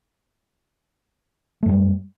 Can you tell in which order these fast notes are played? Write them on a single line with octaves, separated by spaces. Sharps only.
A3 F#2 G3